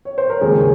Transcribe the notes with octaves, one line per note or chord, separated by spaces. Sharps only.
C#5
C5
A#4
D#2 C#3 G#3 G#4